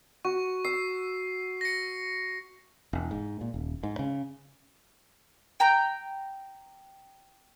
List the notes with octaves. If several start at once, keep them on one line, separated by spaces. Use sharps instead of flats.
F#4 C#6
E6 C7
A#6 C#7
E1
G#2
A#2
D#1
G#2
C#3
G5 A#5 G6